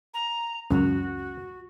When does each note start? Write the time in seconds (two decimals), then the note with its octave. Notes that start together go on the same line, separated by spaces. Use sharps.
0.14 A#5
0.71 C#2 F#2 F#4